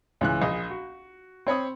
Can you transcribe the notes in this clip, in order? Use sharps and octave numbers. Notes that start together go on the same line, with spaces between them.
C#2 E3 F#6
A#1 D#5
F#4
C4 C#5 B5 D#6